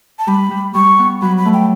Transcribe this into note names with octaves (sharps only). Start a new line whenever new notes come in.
A5
G3 B5
G3
G3 C#6
B3
F#3 B5
B5
A3
G5